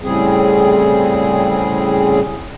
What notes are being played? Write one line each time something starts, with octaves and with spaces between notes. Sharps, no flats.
A2 C#3 G3 C4 G#4